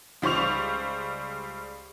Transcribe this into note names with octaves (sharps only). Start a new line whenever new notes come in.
C#2 G3 C5 C#6 F7